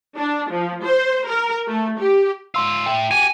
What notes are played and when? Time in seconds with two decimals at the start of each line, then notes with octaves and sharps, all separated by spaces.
0.16 D4
0.50 F3
0.85 C5
1.27 A#4
1.67 A3
1.99 G4
2.55 G#2 F4 C6 E6
2.86 A3 E4 G5
3.11 F#4 G4 G#5